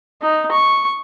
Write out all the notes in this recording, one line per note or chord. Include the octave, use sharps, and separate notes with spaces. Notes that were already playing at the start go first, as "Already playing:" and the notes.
D#4
C#6